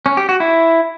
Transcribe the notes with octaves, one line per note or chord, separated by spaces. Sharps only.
C#4
G4
F#4
E4